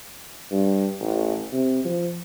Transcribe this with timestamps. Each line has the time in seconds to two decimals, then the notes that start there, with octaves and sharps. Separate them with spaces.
0.51 G2
1.00 A1
1.52 C3
1.85 F3